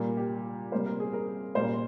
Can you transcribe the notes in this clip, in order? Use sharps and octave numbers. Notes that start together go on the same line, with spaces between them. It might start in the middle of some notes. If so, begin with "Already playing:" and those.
Already playing: A#2 G3 A#3
G4
C3 G3 A#3 C5
A#4
G#4
A#4
A#2 G3 A#3 C5